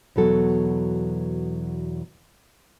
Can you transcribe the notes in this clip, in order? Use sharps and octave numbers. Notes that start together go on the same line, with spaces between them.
E2 B2 F#3 A4